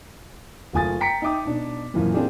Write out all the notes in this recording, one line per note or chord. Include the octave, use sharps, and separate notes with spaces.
F#1 A3 F4 G#5 D#6 A6
G5 A#5 B6 C#7 D7
D#4 E5 G5 D6 D#6
B2 D4 D#4
F#2 A#2 E3 F3
A#3 C4 D4 E4 G4 G#4